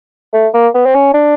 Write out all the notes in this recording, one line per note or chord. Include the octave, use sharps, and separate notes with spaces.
A3
A#3
B3
C4
C#4
D4